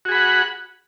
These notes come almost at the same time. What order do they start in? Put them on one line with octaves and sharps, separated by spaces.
F#4 G#4 B5 F#5